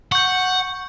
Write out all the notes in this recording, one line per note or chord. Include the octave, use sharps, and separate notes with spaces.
F#5 C#6 G6